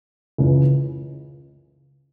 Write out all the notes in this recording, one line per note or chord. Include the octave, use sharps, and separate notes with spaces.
C#2 C#3 E3